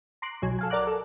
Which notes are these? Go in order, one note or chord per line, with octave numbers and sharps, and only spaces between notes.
A#5 C6 D6 F#6
B1 F#3 G#5
A4 F5 G#5
A#4 D5 F#5 A#5 D6 F#6
A4